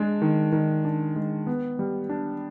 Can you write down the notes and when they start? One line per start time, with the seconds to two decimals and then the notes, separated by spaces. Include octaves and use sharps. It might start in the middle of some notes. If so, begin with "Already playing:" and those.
Already playing: G#3 D4
0.22 D#3
0.52 D#3
0.85 D4
1.16 G#3
1.47 B3
1.79 G3
2.09 D4